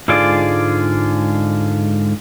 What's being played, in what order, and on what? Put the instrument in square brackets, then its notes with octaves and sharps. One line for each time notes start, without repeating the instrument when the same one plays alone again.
[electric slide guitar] G#2 D3 G#3 F4 G#4 D5